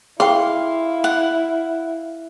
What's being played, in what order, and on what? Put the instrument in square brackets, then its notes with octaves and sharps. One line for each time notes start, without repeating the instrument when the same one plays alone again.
[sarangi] E4 [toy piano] G#4 G5 [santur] F5 [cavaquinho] C6
[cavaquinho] F#5